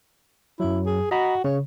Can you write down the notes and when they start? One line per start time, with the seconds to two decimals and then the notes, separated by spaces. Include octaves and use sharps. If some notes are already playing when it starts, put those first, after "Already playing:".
0.60 F#2 F#3 E4
0.86 G#4
1.11 F#4 D#5 A#5 B5
1.44 C#3 C#5